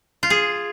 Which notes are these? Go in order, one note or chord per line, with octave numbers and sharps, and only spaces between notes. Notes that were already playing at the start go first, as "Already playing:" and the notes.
F4
G#4